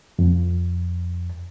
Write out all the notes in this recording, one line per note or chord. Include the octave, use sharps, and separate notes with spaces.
F2